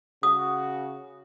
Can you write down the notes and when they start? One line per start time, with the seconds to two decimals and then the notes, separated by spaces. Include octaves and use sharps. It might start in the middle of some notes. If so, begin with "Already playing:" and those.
0.23 C#3 F#4 D#6